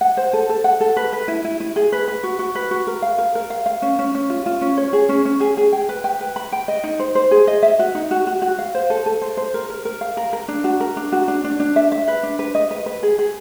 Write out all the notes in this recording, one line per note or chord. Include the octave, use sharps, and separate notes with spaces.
F#5
C5
A4
A4
F#5
A4
B4
B4
E4
E4
E4
G#4
B4
B4
F#4
F#4
B4
F#4
A#4
F5
A#4
A#4
F5
F5
C#4
C#4
C#4
F4
F4
C#4
C#5
G#4
C#4
C#4
G#4
G#4
G5
B4
G5
B4
B5
G5
D#5
D#4
C5
C5
G#4
D#5
E5
F#4
D#4
F#4
F#4
F#4
F5
C5
A4
A4
C5
C5
A#4
A#4
A#4
F5
A#4
A#4
D4
F#4
A#4
D4
F#4
D4
D4
D4
E5
E5
B4
D4
B4
D#5
B4
B4
G#4
G#4